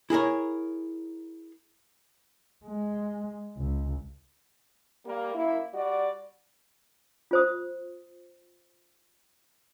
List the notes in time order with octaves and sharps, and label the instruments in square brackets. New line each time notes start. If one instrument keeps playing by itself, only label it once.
[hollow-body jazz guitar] E4 G#4 A#4 C#5
[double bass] G#3
C#2
[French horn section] G3 A#3
F#2 A#3 E4
G3 F#4 D5
[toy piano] F4 C5 D#6